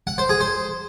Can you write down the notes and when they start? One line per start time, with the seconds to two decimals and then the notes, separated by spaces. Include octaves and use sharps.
0.07 F#5
0.18 C5
0.29 G#4
0.41 C5